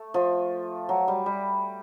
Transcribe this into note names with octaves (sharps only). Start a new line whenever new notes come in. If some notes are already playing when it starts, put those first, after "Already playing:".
Already playing: A3
F3
F#3
G3
G3